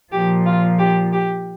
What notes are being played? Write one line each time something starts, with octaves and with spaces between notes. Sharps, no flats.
A#2 F3 G4
F4
G4
G4